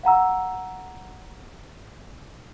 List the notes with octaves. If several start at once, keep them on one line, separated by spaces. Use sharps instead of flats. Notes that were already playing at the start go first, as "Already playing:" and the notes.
F5 F#5 A#5 E6